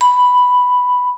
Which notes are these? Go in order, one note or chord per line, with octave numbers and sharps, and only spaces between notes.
B5